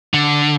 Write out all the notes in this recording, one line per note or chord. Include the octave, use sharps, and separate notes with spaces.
D3